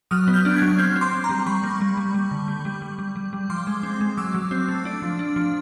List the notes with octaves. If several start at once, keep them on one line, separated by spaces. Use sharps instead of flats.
F#3 D#6 F6
B3
F6 G6
D4
F#6 G#6
F#3
G#6
C4 F6 G6
C4
C6 D6
C4
A#5 C6
G3
G3 B5 C#6
A#3
G3
G3
G3
D3
G3
G3
G3
G3
G3
G3
F3 C6 D6
G#3
C4
G#3
F#3 D6 E6
F#3
C4
A3
D4
F3
D4
F3